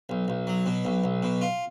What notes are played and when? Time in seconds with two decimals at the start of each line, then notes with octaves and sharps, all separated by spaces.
0.09 B1
0.28 B1
0.47 F#3
0.66 B2
0.85 B1
1.04 B1
1.23 B2
1.41 F4